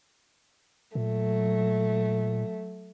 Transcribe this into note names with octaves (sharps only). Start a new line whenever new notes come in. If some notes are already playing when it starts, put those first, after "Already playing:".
A#2 F#3 A3